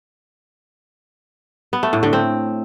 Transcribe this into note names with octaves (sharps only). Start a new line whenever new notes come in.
B3
A3
A2
D3
C4